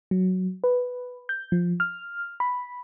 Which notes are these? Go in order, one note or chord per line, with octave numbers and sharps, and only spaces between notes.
F#3
B4
G6
F3
F6
B5